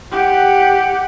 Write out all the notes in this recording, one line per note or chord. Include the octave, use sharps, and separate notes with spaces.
G4 F#5